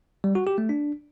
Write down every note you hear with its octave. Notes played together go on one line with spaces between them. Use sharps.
G3
F#4
G4
A3
D4